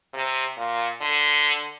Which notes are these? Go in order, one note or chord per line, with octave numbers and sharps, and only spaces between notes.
C3
A#2
D3